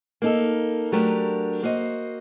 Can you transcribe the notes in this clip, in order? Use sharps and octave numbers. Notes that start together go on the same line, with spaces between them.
A#3 D#4 A4
F#3 A3 D4 G4 A#4
A#3 F#4 C5 D#5